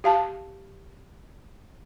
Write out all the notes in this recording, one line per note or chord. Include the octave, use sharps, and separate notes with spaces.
G4 F5 A5